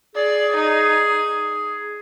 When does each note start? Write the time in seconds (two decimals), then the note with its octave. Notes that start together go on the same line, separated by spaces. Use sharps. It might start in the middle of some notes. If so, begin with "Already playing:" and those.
0.15 G#4 D5
0.56 D#4